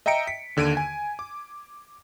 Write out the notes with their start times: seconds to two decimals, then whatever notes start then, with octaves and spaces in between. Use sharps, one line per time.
0.06 D#5 E5 G5 A#5 C#7 D7
0.27 B6
0.56 D#2 D3 G#6 D7 D#7
0.77 G#5
1.19 D6